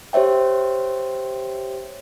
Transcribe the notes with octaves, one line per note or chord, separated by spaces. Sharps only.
G4 C5 C#5 E5 G5